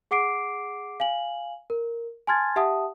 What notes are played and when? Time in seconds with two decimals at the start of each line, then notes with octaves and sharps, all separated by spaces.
0.11 G#4 F#5 D6 C7 D7
1.00 F5 G#5 F#7
1.70 A#4
2.27 G#5 A5 C6 F6 G#6 A6
2.56 G4 E5 F#5 A5 D#6